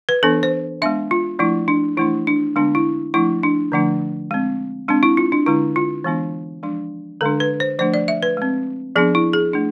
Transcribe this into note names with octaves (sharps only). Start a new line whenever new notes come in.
B4
E3 B3 D4 A4
C5
G#3 B3 D4 E5
F4
F3 A3 D4 E4
D4
E3 A3 D4 E4
D4
D3 G#3 B3 D4
E4
F3 A3 D4 E4
D4
D3 F3 A3 D4
G#3 C4
G#3 C4 D4
E4
F4
D4
D3 G#3 D4 E4
F4
E3 G#3 B3 D4
F3 G#3 D4
D3 G#3 D4 A4
B4
C5
F3 A3 D4 C5
D5
E5
B4
G#3 C4
F3 B3 D4 G#4
E4
G#4
A3 D4